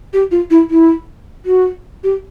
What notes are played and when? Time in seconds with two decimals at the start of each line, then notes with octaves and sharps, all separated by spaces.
0.13 G4
0.31 F4
0.50 E4
0.70 E4
1.46 F#4
2.04 G4